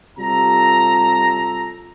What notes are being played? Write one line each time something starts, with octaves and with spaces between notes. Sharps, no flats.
C3 G3 F4 A4 A#5